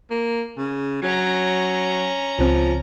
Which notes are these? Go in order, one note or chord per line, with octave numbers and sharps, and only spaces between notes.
A#3
C#3
F#3 C#4 A#5
C#2 C#3 F3 C4